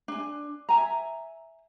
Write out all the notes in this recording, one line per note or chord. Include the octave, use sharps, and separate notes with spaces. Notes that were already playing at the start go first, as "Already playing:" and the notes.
D4 G#5
E5 G#5 A#5